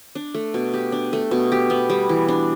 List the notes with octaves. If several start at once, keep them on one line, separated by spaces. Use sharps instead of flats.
D4
A3
B2
G4
D4
A3
B2
G4
B3
G3
E3
D4